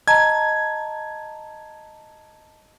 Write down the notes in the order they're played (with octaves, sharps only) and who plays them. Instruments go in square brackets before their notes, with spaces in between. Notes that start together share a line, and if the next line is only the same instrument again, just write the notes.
[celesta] D#5 A5 A#5 [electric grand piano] G#6